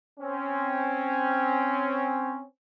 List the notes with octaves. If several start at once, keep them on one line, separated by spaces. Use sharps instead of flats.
C4 C#4